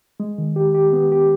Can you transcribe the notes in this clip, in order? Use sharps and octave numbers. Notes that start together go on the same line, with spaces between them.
G#3
D#3
G4
G4
B3
G4